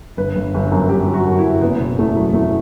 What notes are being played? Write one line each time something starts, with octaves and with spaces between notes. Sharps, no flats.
G1 B4
G1
G1
F#2
G1 G4
F#3
F#4
F#2
F#2 E4
F#1 B3
B2
E2 A3
F#3
E2 A3